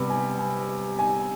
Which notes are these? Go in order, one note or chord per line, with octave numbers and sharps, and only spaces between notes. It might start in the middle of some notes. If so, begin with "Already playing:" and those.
Already playing: C3 G3 B3 B5
G#5
G#5
G#5